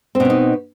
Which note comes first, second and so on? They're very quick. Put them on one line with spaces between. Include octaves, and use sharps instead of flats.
C4 B2 C#4 D#4